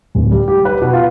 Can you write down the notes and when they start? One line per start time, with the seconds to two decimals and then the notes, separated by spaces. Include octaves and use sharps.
0.15 D1
0.31 G3
0.48 G4
0.65 B4
0.82 B2
0.93 F4